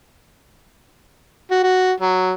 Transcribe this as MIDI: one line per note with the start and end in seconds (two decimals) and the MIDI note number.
1.51 1.59 66
1.63 1.92 66
2.00 2.34 54